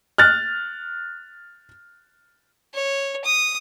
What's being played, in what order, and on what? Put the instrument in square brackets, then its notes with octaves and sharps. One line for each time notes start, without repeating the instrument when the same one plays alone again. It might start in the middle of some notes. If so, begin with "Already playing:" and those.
[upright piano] F6 F#6 A6
[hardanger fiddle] C#5
D#6